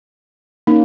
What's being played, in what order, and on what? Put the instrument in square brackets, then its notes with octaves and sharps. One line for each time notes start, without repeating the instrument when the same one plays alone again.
[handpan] A#3 C#4 [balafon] D#4